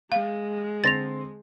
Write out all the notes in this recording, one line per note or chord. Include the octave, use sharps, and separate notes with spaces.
G#3 F5
D3 C4 C6 A6 A#6 F7